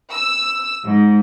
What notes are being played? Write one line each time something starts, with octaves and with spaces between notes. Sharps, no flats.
E6
G#2